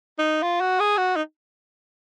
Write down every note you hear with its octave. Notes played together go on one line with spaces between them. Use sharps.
D#4
F4
F#4
G#4
F#4
D#4